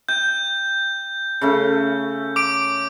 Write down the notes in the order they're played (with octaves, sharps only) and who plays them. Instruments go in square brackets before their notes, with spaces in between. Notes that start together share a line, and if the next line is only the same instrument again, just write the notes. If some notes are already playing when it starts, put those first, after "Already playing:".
[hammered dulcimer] G5 [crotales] G6
[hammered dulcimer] C#3 A3 C#4
[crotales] D6 D7